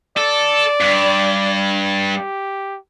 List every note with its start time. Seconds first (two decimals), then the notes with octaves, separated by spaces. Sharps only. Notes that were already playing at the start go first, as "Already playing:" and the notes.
0.17 A4 D5
0.80 G2
2.16 G4